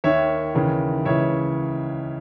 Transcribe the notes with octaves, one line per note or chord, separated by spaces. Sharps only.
D#2 D#3 C#5 E5
D#2 C#3 E3
C#2 C#3 E3 C#5 E5